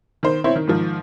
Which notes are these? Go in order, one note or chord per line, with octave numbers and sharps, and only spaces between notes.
D#3 C5
C4 E4 C5 C#5
D#3
G#2 D#3 F3